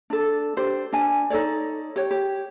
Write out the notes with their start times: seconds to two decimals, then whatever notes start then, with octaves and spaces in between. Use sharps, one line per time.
0.10 D4 A4
0.57 D4 G4 C5
0.93 D4 G#5
1.30 D#4 A4 C#5 D5
1.96 G4 C#5
2.11 G4